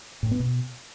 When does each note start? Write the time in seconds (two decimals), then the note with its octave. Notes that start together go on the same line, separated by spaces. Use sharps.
0.23 A2
0.31 B3
0.40 B2